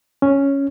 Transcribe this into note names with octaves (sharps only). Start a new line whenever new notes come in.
C#4